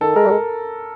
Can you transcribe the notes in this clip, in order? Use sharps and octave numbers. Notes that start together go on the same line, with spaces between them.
D#3 A4
G#3 A#4
G3
G#3 A#4